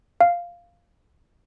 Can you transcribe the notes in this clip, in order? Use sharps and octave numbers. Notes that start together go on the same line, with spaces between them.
F5